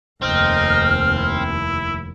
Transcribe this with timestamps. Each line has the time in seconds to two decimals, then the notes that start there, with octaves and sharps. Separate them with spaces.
0.22 F1 D#2 C4 D#4 F6
1.16 E4